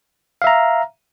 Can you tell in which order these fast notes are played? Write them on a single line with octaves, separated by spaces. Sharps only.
F5 E5 A#5